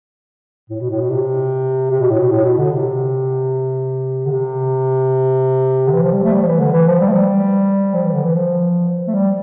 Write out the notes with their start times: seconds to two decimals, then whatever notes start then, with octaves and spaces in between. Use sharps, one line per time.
0.70 A2
0.80 B2
0.90 A2
1.01 B2
1.10 C3
1.91 C3
2.00 B2
2.10 A2
2.20 B2
2.31 A2
2.44 B2
2.58 D3
2.72 C3
4.26 D3
4.31 C3
5.87 D3
5.93 E3
6.03 F3
6.13 G3
6.23 A3
6.33 G3
6.42 F3
6.47 E3
6.60 D3
6.73 E3
6.87 F3
7.00 G3
7.09 A3
7.13 G3
7.94 F3
8.04 E3
8.13 D3
8.24 E3
8.34 F3
9.08 A3
9.14 G3